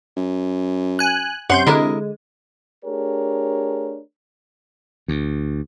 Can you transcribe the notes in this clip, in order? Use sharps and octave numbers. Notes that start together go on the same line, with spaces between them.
F#2
G#5 F#6
F#2 C3 C#4 F#5 C6 G6
D3 G#3 E4 A#4 D#5
A3 D4 G4 G#4 A#4 C#5
D2